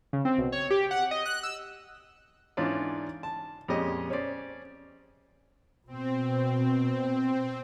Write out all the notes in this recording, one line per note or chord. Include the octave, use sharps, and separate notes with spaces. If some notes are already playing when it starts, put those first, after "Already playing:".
C#3
C4
B1
C#5
G4
F#5
D#5
F#6
E6
G#2 E3 C#4 D4 F4 D5
A5
F2 A#2 G#3 C#4 G4 D#5
C#4 C5 D5
B2 C4